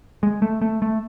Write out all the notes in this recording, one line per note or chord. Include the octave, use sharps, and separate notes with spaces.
G#3
A3
A3
A3